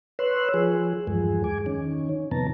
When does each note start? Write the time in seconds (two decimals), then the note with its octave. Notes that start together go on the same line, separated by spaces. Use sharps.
0.19 B4 C#5 C6 E6 F#6
0.54 F3 G#4
1.07 E2 G2 F3 G#3 G#4
1.44 G#5 D6
1.66 D#3 C#4
2.31 F2 C3 D#3 B3 A5 A#5